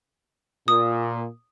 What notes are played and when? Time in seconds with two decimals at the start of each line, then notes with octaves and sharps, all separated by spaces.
0.68 A#2 D#6